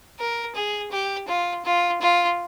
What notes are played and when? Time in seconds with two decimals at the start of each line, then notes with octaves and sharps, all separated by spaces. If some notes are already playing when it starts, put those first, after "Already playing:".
0.19 A#4
0.55 G#4
0.91 G4
1.27 F4
1.65 F4
2.01 F4